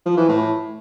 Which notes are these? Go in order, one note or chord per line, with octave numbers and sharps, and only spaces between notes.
F3
E3
A2